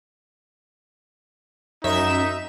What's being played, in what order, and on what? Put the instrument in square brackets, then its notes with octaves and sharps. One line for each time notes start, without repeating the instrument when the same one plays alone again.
[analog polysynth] F#2 E5 E7 [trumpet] D#4